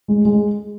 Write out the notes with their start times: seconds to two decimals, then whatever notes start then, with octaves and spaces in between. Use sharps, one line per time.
0.08 G#3
0.25 G#3